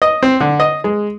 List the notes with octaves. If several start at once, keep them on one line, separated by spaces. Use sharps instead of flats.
D#5
C4
D3
D#5
G#3